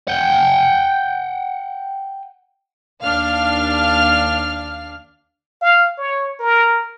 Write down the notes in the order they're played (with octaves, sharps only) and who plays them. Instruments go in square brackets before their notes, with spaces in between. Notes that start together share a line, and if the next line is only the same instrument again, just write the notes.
[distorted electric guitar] F#5 G5
[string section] D#2 D4 F5 F6
[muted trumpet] F5
C#5
A#4